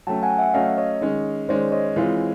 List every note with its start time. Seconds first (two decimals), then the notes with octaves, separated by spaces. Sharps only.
0.07 F#3 A3 C#4 G5 A5
0.23 F#5 G#5
0.38 E5 F#5
0.54 F#3 A3 C#4 D#5 F5
0.78 C#5 D#5
1.01 D#3 G#3 C#4
1.49 D#3 G#3 C#4 C5 D5
1.72 C#5 D#5
1.96 E3 G#3 C4 F4